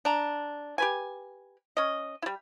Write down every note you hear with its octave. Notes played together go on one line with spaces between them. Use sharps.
D4 A#5
G4 B4 G#5
C#4 D#5
G3 E4